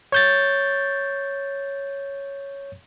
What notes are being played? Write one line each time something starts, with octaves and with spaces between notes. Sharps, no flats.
C#5 G6 A6